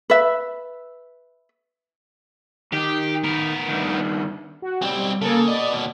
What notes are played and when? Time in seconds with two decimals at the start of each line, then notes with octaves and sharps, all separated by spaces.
0.10 B4 E5
2.73 D#3 G4
3.24 B3 A#4
3.68 G2 D#3
4.62 F#4
4.82 B1 G3 C4
5.21 C#3 A#3 A4
5.48 B3 D5 D#5
5.73 D#2 B2